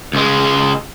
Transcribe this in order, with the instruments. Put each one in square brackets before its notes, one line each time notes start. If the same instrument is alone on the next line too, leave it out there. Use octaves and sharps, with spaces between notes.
[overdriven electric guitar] C#2 G#3